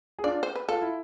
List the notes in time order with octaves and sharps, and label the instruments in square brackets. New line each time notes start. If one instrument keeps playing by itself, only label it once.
[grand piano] G#4
[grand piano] D4 F4 [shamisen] D5
[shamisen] C5
B4
[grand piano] F4 [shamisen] A4
[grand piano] E4